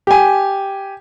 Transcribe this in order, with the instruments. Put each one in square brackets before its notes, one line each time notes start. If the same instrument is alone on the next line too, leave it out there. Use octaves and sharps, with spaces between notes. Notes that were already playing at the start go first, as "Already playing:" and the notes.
[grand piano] G4 G#5